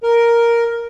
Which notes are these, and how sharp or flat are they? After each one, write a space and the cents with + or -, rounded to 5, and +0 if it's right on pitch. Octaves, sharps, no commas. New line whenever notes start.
A#4 +5